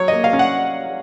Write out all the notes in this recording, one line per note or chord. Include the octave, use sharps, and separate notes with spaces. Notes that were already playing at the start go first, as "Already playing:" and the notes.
Already playing: F#3 C#5
A#3 D#5
F5
C#4
F#5